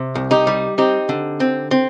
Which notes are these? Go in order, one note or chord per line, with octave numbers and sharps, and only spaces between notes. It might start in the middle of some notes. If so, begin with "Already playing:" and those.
Already playing: C3
C2
D#4 G4
G3
C4 D#4 G4
D3
C4
C4